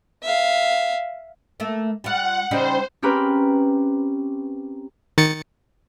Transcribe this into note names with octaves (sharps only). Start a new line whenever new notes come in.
E5 F5
A3 A#3
G3 F4 F#5
C#3 G3 D#4 C5
C4 C#4 G4 A#4 B4 B5
D#3 A6 C#7